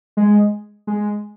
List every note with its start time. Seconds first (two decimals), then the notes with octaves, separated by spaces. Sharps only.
0.17 G#3
0.87 G#3